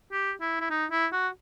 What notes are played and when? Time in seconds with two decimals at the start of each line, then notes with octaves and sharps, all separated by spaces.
0.12 G4
0.41 E4
0.60 E4
0.70 D#4
0.91 E4
1.13 F#4